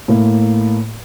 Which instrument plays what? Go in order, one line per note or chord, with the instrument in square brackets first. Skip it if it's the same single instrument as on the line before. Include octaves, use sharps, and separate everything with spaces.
[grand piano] A2 A#3